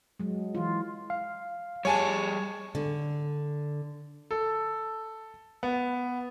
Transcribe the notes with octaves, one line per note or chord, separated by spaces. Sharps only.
F#3 G#3
E3 F4
F5
G3 G#4 C#5 G#5 A5 C#6
D3
A4
B3